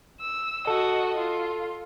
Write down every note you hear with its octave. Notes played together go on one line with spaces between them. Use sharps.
E6
F#4 A4 D#5
F4